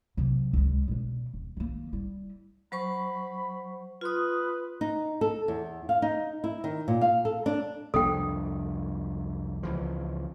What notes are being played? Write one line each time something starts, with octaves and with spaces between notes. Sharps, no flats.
C3 F#3
C#2 G#3
B2 D3
D#1
D#3 A#3
G3 E4
F#3 C5 B5 C#6
F4 B4 C6 D#6
D#4
A4
E2
F5
D#4
E4
D#3
A#2
F5
A4
D4
C2 F2 D4 A4 G5
C#2 E3 F3